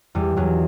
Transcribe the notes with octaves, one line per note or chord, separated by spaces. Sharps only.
E2 G3
E2 F#3